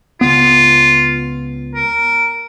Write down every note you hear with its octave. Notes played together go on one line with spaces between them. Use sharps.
C#2 B3 F4
A#4